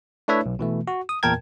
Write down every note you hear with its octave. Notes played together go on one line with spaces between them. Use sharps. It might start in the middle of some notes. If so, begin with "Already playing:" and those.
A3 D4 E4 B4 C#5 E5
B1
B2 E3 A3
F#4
D#6
E2 A#2 A#4 G5 A5 G#6